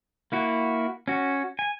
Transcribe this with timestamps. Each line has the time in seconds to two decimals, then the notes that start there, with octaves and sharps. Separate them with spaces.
0.32 A#3 E4 F#4
1.08 C#4 F#4
1.59 G#5